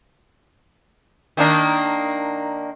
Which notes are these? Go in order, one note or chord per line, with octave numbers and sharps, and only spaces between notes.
D#3 A#3 D4